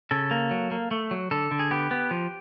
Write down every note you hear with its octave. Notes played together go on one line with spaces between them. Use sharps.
C#3 A4
A#3
F#3
A#3
A3
F#3
D3 A4
D3
G#4
B3 G4
B3
F3